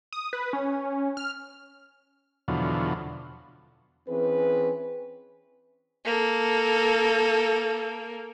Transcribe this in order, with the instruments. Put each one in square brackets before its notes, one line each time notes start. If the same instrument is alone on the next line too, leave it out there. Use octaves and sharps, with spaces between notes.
[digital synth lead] D#6
B4
C#4
F6
[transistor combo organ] E2 B2 D3 F3 F#3
[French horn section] E3 C4 C#4 G#4 B4
[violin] A#3 A4